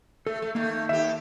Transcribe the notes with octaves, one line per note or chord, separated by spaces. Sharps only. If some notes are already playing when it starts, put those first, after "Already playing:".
A3 A4
A3
D#3 A3 A#3
D#2 G4 E5